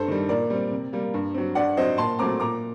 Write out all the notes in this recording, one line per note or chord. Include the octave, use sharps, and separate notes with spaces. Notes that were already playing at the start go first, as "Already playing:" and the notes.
Already playing: G2 A4 C5
D#3 G3
A#2 A#4 D5
G3 C4
C3
G3 A#3
G2
F#3 C4
G2 D5 F#5
F#3 C4 C5 D#5
A#2 A5 C6
F#3 A3 C4 A#5 D6
A#2 A#5 D6